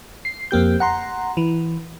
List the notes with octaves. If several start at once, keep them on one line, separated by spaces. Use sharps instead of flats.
C7
F2 A#3 G4 G6
F#5 A#5 C6
E3